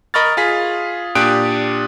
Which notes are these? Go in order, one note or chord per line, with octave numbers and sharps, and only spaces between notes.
A#4 D#5 B5 C#6 F6 A6
F4 G#4 B6
A#2 D4 G4 D#6 F#6 D7